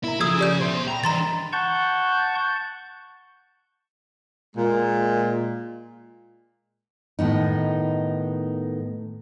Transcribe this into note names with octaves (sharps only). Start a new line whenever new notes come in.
A#3 E4 A#5
C#3 F3 F4 G#4 A4 D#6 E6 G#6
G4 D5 G6
A#2 G#4 C5 E5 C6
G5 A#5 B5
E3 D4 A#5 C6 A6
F#5 A5 C#6 G6
A#2 G#3
A2 D#3 B3 D#4